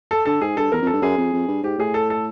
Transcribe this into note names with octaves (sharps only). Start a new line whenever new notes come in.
A4
D3 A4
G#2 G#4
G2 A4
E2 A#4
F2
A4
G2
F#2 G#4
F2
F2
G2
G#2 G4
A2 G#4
A4
A4